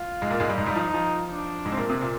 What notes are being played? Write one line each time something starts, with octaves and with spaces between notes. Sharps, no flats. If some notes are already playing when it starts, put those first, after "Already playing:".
Already playing: F4
G#2 G#3
A#2 A#3
G#2 G#3
G2 G3
G#2 G#3 D#4
G2 G3
F3
F3
D4
G#2 G#3
C4
A#2 A#3
C3 C4
A#2 A#3